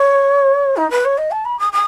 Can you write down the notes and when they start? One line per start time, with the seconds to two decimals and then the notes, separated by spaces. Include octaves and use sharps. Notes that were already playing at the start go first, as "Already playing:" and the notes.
Already playing: C#5
0.76 D#4
0.90 B4
1.05 C#5
1.17 D#5
1.31 A5
1.45 B5
1.59 D#6
1.72 D#6